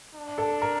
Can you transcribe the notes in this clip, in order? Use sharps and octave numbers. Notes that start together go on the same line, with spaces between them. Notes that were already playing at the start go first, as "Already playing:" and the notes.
D4
A4
A#4